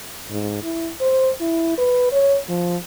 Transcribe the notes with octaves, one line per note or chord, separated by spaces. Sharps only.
G#2
E4
C5
E4
B4
C#5
F3